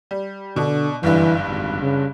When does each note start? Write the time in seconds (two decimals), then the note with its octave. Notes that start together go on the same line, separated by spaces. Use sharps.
0.11 G3
0.56 B2 D3 D4
1.03 F#1 G2 D3 E3
1.48 G#1
1.82 C#3